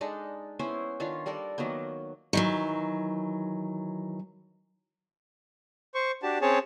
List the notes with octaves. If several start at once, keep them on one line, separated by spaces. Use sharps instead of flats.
G#3 D4 D#4 A4
B3 C#4 E4 C5
D#3 D4 F4 C#5
G3 A4 A#4 D5
D#3 F#3 A#3 B3
D#3 E3 F#3
C5 C#6
D4 F#4 G4 A5
C4 C#4 G#4 C#5 A5